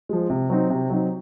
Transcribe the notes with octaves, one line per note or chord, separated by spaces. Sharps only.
F3 G#3
C3
F#3 C4 D#4
C3
F#3 C4 D#4